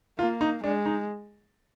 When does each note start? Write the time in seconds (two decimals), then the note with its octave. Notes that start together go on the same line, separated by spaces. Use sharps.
0.18 A#3 F4
0.41 D#4
0.64 G#3 D4
0.86 D#4